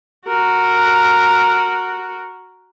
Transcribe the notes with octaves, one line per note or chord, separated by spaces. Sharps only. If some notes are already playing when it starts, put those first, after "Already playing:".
F#4 A#4